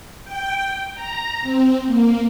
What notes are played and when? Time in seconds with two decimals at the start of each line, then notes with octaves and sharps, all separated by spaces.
0.25 G5
0.95 A#5
1.43 C4
1.87 A#3